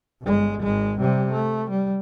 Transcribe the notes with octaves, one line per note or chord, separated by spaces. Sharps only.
G1 G#3
G#1 G#3
C3 G3
A3
G3